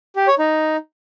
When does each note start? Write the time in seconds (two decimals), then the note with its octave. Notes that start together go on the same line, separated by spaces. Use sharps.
0.16 G4
0.27 C#5
0.39 D#4